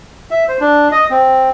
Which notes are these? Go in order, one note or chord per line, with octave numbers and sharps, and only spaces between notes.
E5
C5
D4
D#5
C4